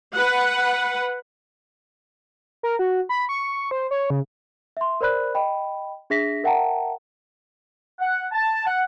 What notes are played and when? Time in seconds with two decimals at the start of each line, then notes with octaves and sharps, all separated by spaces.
0.15 B4 F#5
2.63 A#4
2.79 F#4
3.09 B5
3.29 C#6
3.71 C5
3.91 C#5
4.10 C#3
4.77 E5 C6
5.01 A#4 C5 D5 B5 F#6
5.34 D#5 G5 B5
6.10 D4 G#4 E5 A#6 B6
6.44 A#4 E5 F#5 G5 A5 A#5
8.00 F#5
8.31 A5
8.65 F#5